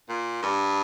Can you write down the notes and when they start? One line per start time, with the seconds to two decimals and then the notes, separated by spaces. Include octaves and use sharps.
0.09 A#2
0.43 G2